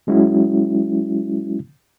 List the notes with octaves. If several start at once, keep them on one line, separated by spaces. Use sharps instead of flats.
F#3 G#3 C#4 E4 F#4